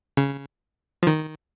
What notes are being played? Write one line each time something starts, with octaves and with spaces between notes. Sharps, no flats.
C#3
F3
D#3